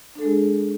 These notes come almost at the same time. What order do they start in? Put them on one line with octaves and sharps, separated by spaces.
D4 A4 G#3 G#4